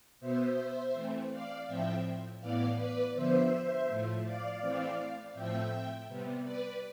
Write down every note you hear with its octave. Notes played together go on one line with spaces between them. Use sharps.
B2 B3 C5 E5
E3 A3 C4
D5 F5
A2 F3 C4 E5 G5
A2 E3 B3 D5 F5
B4 D5
D3 F3 B3 C5 E5
A2 F3 A3
D5 F5
E3 A3 C4
A2 F3 A3 C4 E5 G5
C3 G3 B3
B4 D5